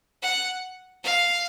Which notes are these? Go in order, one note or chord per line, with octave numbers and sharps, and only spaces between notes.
F#5
F5